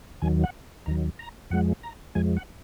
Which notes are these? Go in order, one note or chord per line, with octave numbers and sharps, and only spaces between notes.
D#2 D#3 F#3 G#5
F#5
D#2 D#3 F#3 A#5
A#5
F2 F3 G#3 F#5
A#5
F2 F3 G#3 G#5
F#5